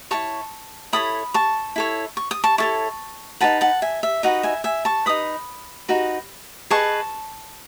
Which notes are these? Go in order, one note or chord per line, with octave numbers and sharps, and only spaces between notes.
E4 A4 C#5 A5 C#6
E4 A4 C#5 B5 D#6
A5 C#6
E4 A4 C#5
C#6
D#6
A5 C#6
E4 A4 C#5 A5 C#6
D#4 F#4 B4 F#5 A5
F#5 A5
E5 G#5
E5
D#4 F#4 B4 D#5 F#5
E5 G#5
E5 G#5
A5 C#6
D#4 F#4 B4 B5 D#6
D#4 F#4 B4
G#4 B4 D#5 A5 C#6